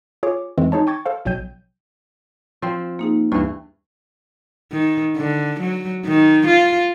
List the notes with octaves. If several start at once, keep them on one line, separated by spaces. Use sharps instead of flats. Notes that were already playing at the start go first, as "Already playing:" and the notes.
F4 G#4 C#5 D6
F2 D#3 E3 G#3 A3 C4
D#4 G#4 C#5 A5
G5 C#6 G#6 A6
A4 C5 F5
A#1 B2 F#3 G5 G6 D#7
F3 C4
A#3 D#4 G#4
D2 G2 E3 B4
D#3
D3
F#3
D#3
F4